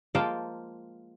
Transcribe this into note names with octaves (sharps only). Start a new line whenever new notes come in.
F3 G#3 A#3 F5 G5 A5